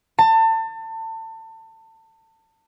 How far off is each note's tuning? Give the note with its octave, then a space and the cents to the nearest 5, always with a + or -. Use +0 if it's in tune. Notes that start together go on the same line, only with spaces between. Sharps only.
A5 +30